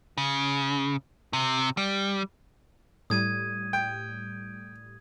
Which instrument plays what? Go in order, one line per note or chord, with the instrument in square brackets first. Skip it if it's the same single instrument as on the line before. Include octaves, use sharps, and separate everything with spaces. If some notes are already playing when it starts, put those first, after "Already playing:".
[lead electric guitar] C#3
C3
G3
[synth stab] A2 G3 [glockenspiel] D#6 G#6 D#7
[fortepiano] G5